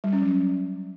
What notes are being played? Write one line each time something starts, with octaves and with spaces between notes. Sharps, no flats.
G3
C#4
F#3